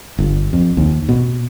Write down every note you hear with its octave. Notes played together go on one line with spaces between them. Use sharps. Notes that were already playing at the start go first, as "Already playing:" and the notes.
G1
F2
D#2
B2